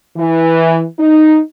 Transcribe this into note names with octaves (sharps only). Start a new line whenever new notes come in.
E3
D#4